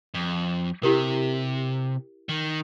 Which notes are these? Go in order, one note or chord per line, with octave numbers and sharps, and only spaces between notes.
F2
C3 E4 G4 A#4
D#3